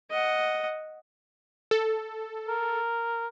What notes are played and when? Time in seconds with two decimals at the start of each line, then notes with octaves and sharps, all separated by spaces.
0.10 D#5 F#5
1.71 A4
2.49 A#4